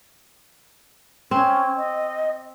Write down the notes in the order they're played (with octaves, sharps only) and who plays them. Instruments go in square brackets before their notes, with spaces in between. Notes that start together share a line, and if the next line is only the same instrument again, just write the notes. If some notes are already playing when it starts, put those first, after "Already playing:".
[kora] C4 [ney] C#4
[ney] D#5